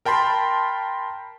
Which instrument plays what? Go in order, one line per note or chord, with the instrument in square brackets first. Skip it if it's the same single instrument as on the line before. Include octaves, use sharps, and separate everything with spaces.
[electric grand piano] A#4 G5 A5 B5 C6